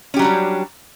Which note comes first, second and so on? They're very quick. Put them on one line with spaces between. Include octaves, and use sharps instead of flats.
C#4 G4 F#3 D4 G3